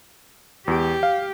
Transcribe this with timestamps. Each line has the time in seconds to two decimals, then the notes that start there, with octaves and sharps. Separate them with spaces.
0.68 E2 G4
1.03 F5